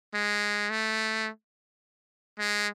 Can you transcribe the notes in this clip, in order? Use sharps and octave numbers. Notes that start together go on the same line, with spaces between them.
G#3
A3
G#3